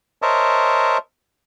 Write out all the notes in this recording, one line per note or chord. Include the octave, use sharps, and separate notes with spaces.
A#4 C5 C#5 D#5 E5 A5